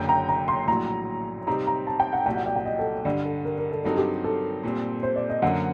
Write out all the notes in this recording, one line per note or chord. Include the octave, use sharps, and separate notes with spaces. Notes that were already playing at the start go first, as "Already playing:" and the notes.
Already playing: F#1 F#2 D3 G5
A#5
A#5
C6
A#1 A2 F#3 A#5
C3 G3 C4 D#4 A#5
A#5
A5
G5
F#5
C2 A#2 F#3 G5
F#5
D5
G5
D#5
A4
G2 D3 G3 D5
A4
A#4
A#4
A4
G2 F#3 C4 D#4 A4
G4
A4
A#2 G3 C4
C5
D5
D#5
F#2 D3 F#3 A#3 F#5